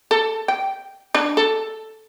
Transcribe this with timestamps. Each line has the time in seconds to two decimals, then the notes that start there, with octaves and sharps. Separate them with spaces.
0.11 A4
0.48 G5
1.15 D4
1.37 A4